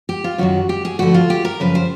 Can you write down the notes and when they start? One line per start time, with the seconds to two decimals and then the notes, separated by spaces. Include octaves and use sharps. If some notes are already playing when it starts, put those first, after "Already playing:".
0.09 G4
0.24 F4
0.38 F#2 D#3 F#3 F#4
0.69 G4
0.85 G#4
0.99 G2 D3 F3 A3 F#4
1.14 F4
1.30 G4
1.45 A#4
1.60 F#2 C#3 F3 B4
1.75 C5